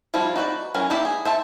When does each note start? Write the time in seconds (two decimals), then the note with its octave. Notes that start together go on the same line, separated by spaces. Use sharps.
0.14 F3 G3 C4 E4 F4
0.36 D#4 F#4 B4 D5
0.74 E3 F#3 C#4 A#4
0.90 A#3 E4 G4 D5 E5
1.05 G#4
1.25 C5 E5 A5